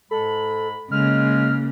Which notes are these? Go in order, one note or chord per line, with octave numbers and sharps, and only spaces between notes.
G#2 G#3 A4 B5
C#3 G#3 A#3 F6